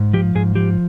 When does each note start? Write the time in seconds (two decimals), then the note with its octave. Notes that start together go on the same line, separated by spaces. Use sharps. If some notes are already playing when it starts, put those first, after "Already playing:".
Already playing: G#2
0.13 F3 G4
0.35 G#2 G#4
0.55 F3 G4